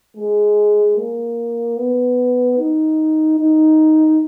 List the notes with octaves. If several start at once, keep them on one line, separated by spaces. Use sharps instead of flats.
G#3
A#3
B3
D#4
D#4